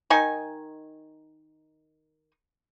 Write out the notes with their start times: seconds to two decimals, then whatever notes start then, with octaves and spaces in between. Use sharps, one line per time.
0.10 D#3 D#4 G#5